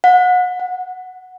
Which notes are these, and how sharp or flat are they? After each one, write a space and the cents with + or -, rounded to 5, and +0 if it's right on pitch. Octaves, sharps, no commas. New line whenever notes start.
F#5 -30
F#5 -5